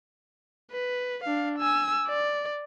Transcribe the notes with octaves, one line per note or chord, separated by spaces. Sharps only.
B4
D4 F5
G#5 E6
D5